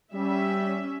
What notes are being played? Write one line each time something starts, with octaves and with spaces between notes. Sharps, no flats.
G3 C#4 E5